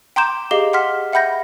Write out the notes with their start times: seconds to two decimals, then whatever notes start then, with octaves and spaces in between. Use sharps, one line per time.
0.16 G5 A#5 C6 D6 G6 E7
0.51 G4 G#4 D#5 F5 D6 G7
0.73 F#5 C6 F6 B6
1.13 E5 F#5 G5 B5 G6 A#6